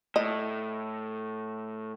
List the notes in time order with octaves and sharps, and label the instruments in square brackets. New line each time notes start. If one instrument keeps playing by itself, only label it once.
[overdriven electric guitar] A2 [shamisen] D#5